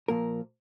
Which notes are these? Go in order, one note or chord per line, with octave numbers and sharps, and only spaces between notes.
A#2 F3 A#3 A#4